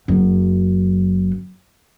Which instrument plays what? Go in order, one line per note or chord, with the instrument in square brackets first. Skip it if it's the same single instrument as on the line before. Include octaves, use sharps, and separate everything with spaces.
[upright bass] F#1 F#2